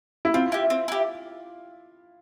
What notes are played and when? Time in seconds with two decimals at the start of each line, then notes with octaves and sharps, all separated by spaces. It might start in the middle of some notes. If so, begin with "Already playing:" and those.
0.25 E4
0.34 C4 F4
0.52 E4 G4
0.70 C4
0.88 E4 G4